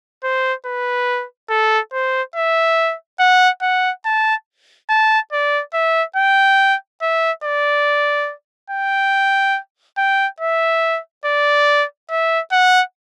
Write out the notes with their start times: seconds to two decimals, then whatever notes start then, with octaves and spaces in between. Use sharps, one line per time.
0.24 C5
0.66 B4
1.50 A4
1.92 C5
2.36 E5
3.19 F#5
3.62 F#5
4.05 A5
4.89 A5
5.32 D5
5.74 E5
6.16 G5
7.02 E5
7.44 D5
8.70 G5
9.98 G5
10.40 E5
11.25 D5
12.10 E5
12.52 F#5